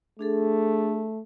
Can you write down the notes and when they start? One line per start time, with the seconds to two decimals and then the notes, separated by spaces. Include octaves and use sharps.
0.19 A3 D4 G#4 A4